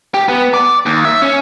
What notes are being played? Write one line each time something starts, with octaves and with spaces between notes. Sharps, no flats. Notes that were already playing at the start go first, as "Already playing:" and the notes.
G4
B3
D5
D#2
E5
C#4